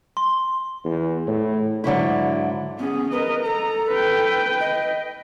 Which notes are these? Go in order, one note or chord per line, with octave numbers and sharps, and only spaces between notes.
C6
E2
A2
G#2 D3 F#3 E4
B3 C#4 G#4
A#4 B4 D#5
A4 A#5
B4 G5
D#5